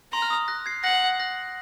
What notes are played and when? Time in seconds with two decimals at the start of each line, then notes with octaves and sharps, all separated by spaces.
0.13 A#5 C6
0.22 F6
0.30 D#6
0.48 F#6 A#6
0.66 G#6 C7
0.84 F#5 F#6 A#6
1.20 F#6 A#6